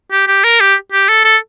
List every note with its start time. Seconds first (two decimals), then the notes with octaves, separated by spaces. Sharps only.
0.12 G4
0.27 G4
0.44 A#4
0.60 G4
0.92 G4
1.09 A4
1.24 A4